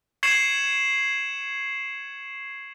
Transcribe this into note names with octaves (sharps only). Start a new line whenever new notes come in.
C#6 G#6 C7 C#7 E7 F#7